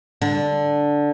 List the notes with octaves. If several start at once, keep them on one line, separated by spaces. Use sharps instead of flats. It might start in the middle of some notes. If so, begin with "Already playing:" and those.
D3